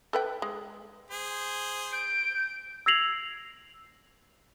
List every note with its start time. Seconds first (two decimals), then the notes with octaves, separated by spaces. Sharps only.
0.13 A4 B4 G5
0.42 G#3
1.10 G#4 C5
1.92 G6 D7
2.86 E6 G#6 A#6 C7 F7 F#7